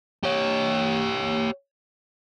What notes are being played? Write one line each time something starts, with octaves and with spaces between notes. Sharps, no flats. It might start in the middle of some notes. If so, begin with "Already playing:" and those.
G4 C#5